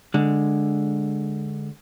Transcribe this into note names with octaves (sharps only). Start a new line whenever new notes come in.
D3 G#3